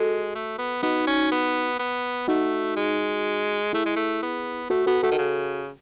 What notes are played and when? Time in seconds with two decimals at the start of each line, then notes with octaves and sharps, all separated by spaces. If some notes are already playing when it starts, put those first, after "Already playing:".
Already playing: G#3 F#4 A4
0.35 A3
0.58 B3
0.83 B3 D#4 F#4
1.07 C#4
1.32 B3
1.79 B3
2.28 A3 D#4 F#4
2.76 G#3
3.73 A3 E4 G#4
3.86 G#3
3.96 A3
4.22 B3
4.70 A3 F#4 A4
4.86 B3 F#4 A4
5.03 A3 F#4 A4
5.12 D#3
5.19 C#3